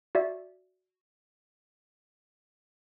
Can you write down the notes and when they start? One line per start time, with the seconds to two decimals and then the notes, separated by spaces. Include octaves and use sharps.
0.15 F#4 D5 E5